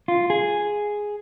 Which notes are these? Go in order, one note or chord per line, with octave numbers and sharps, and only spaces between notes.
F4
G#4